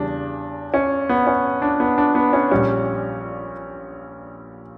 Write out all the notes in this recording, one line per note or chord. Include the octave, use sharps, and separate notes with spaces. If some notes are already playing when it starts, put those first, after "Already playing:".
Already playing: E2 C#3 G3 D4
C#4
B3
C#4
D4
B3
D4
B3
C#4
A#1 A#2 G3 C#4